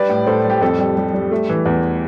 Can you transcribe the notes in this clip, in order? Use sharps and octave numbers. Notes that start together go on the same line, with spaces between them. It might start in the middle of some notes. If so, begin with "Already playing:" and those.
Already playing: G3 B4 D5
A2
A2 A4 C5
G3
G4
F2 A4
G3
G3
G3
A3
E3
E2